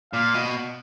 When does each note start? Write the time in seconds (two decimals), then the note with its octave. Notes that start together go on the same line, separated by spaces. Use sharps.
0.13 A#2 F5
0.34 B2